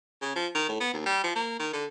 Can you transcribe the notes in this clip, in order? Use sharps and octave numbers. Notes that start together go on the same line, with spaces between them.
C#3
F3
D#3
A2
B3
D#2
G3
F3
A#3
D#3
D3